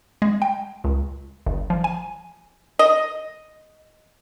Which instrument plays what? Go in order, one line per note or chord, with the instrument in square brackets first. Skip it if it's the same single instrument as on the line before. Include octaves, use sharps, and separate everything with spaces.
[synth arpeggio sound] G#3
G5
C#2
G1
F3
G#5
[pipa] D#5